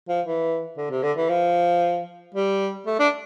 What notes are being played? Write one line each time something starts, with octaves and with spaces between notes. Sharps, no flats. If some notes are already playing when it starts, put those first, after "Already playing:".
F3
E3
D3
C3
D3
E3
F3
G3
A3
D4